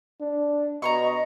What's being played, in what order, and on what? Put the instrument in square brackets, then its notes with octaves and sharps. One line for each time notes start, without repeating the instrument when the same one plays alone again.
[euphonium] D4
[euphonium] B2 [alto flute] D#5 [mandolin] A#5 C6 C#6